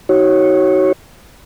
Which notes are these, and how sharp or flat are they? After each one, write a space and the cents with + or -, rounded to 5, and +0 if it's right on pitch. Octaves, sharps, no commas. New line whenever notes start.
D#4 +30 F#4 +35 C#5 -15